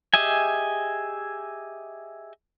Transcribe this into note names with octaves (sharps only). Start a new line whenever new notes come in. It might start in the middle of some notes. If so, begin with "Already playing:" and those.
G4 G#4 D#5 E5 G#5